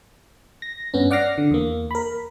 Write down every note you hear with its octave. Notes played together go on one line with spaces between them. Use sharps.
A#6
G2 B3 C#4
D5 F#5 D6 F6 A#6 C7
D3
E2 A#3
A#4 B5